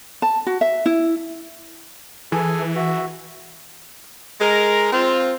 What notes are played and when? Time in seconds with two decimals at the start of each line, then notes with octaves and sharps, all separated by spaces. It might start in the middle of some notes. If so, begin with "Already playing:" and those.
0.22 A5
0.47 F#4
0.61 E5
0.86 E4
2.32 E3 G#4 A4 G#5
2.76 F#4 E5
4.41 G#3 A#4
4.92 C4 F4